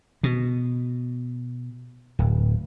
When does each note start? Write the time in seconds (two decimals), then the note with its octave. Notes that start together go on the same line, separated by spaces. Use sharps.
0.23 B2
2.19 D1